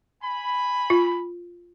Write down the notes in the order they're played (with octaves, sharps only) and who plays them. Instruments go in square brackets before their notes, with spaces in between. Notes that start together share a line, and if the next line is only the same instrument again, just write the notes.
[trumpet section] G#5 B5
[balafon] F4